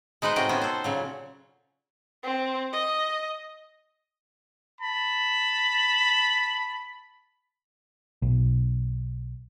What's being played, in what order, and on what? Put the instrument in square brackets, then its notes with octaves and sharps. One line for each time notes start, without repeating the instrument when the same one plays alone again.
[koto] G#3 D#4 B4 C5 D#5
A2 C3 F#4 D#5 G5
B3 C#4 C5
A4 C5
A#2 C#3 F#3
[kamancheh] C4
D#5
[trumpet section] A5 B5
[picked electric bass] B1